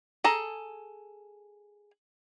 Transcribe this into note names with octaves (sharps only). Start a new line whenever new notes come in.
G#4 A4 A#5